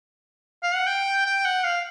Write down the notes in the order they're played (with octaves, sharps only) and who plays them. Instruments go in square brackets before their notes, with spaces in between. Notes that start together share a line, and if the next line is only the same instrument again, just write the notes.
[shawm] F5
F#5
G5
G5
F#5
F5